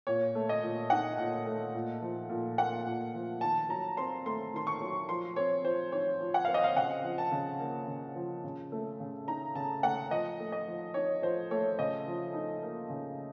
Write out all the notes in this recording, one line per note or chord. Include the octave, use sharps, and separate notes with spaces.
A#2 C#5
A3
D#5
A#2
D#4 F#5
A#2
A3
A#2
F3
A#2
A#3 F#5
A#2
F3
D#3 A5
F#3 A#5
C4 C6
A3 C6
D#3 C6
C#6
F#3
F3 C6
C4 C#5
F3 C5
D#4 C#5
F3
F#5
C4 F5
D#5
F5
C#3 F#5
F3
A5
C#3
A#3
C#3
F3
C#3
A3
C#3
D#4 A#5
C#3 A5
A3 F#5
F3 D#5
A3
D#5
F3
D#4 C#5
F3 C5
A3 C#5
C#3 D#5
F3
D#4
A#3
C#3